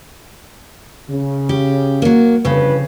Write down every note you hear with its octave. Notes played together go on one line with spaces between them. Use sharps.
C#3
G4
F#3 A#3
G1 F2 C#3 B4